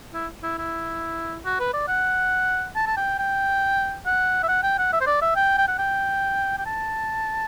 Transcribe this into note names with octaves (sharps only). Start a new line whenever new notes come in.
E4
E4
E4
F#4
B4
D5
F#5
A5
A5
G5
G5
F#5
E5
F#5
G5
F#5
E5
C5
D5
E5
G5
G5
F#5
G5
G5
A5